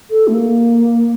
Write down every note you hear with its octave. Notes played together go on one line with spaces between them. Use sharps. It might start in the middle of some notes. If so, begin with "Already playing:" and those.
A4
A3
A#3